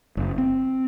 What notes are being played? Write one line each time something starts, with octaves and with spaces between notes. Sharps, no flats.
F#1
C4